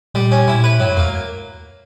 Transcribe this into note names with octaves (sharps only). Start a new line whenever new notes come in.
A#2 G3
C#4
A#2 E4
B4
G2 F#3
F#2
E2 A#3